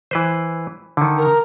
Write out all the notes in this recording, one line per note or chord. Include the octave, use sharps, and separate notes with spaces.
E3 B4 C5
D3 D#3
A#4